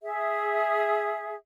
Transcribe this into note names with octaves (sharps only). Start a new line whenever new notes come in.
G#4 E5